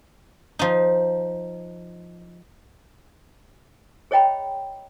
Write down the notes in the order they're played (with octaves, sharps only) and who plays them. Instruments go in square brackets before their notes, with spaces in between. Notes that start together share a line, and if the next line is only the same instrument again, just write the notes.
[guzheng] F3 D#4
[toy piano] G#4 C#5 D#5 G5 A#5 B5